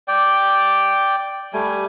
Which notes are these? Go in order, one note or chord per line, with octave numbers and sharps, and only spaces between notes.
D5 G5
G3 A3 G#5